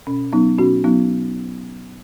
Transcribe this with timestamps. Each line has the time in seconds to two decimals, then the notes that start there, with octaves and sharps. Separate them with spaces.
0.07 B2 C#4
0.33 F#3 B3 D#4
0.58 B2 C#4 F#4
0.84 F#3 B3 D#4